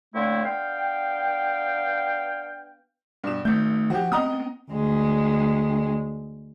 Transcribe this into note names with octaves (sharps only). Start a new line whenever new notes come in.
A2 D3 A3 A#3 C4 E4
B3 D4 F5 G5
G2 B2 E7
G#1 A3 G6
F3 F#4 G4
B3 C4 D#5 A#5 D#6
D2 G#3